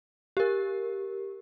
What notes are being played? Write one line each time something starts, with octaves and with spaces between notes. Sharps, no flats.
G4 A#4